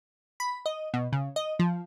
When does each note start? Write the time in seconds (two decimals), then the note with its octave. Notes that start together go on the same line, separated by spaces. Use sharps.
0.40 B5
0.66 D#5
0.94 B2
1.13 C#3
1.36 D#5
1.59 F3